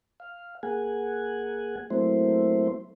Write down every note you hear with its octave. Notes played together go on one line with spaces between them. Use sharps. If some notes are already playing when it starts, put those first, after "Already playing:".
F5
A#3 G#4 F#5 G#5
F#3 A3 A#3 C4 E4 C5